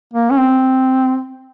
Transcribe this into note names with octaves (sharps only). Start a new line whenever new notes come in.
A#3
C#4
C4